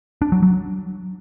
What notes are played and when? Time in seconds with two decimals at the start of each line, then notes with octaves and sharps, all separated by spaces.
0.22 D4
0.32 F#3
0.42 F#3